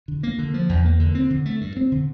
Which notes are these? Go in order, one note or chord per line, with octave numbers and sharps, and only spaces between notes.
D3
A#3
D3
F3
E2
A#3
D3
C4
D3
A3
G2
C4
D3